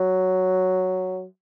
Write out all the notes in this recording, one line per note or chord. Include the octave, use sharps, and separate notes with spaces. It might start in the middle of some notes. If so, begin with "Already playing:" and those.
Already playing: F#3